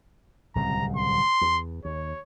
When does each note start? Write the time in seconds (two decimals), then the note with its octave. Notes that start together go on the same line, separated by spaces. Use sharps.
0.55 D1 C2 C#3 A#5
0.97 C6
1.41 E2
1.85 D#2 C#5